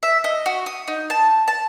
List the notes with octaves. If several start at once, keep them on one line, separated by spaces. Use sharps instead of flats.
E5
D#5
F#4
D#6
D#4
A5
A5